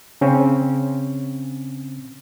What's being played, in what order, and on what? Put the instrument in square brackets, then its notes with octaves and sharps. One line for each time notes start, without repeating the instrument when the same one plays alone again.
[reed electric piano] C#3 C4 C#4